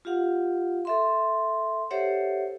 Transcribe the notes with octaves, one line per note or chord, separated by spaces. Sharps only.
F4 G4 F5 F#5
A4 E5 C6
G4 A4 C5 C#5 E5 F#5